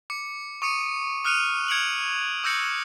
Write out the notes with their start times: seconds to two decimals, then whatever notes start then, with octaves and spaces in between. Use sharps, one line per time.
0.10 D6 C#7
0.62 C#6 D#6 C#7 D#7
1.24 D#6 F6 F#6 C#7 D#7 F7
1.68 F6 G#6 C#7 D7 F7 F#7
2.44 D6 E6 G6 A#6 C#7 D#7